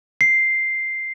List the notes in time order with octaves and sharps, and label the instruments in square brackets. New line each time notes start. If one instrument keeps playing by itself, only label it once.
[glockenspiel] C7